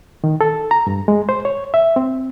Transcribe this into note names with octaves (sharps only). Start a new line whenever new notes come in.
D#3
A4
A#5
G2
G#3
C5
C#5
E5
C4